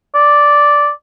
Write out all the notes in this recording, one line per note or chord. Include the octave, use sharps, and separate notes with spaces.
D5